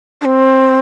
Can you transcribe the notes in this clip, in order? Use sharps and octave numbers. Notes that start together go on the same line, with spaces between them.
D4
C4